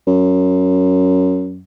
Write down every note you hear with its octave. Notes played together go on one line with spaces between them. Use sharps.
F#2